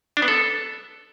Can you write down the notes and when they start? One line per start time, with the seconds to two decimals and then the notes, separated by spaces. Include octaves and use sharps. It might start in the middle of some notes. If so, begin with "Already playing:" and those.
0.17 D4
0.22 B3
0.28 A4